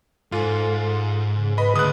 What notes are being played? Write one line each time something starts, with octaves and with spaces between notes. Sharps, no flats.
G#2 F4 A4
C#3
B4 D#5 B5
D2 C#3 D#6 F#6